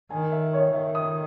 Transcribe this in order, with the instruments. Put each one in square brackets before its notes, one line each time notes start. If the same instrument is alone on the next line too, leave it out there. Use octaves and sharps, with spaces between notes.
[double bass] D#3 [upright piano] G#5
[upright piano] E5
C#5
[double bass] D#3 [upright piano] E5
[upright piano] D#6